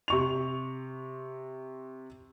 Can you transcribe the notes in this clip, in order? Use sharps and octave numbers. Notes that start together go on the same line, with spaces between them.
C3 C#6 F7